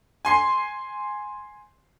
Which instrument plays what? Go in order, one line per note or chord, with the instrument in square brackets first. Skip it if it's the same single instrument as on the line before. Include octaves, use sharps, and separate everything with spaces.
[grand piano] G#5 C6 C7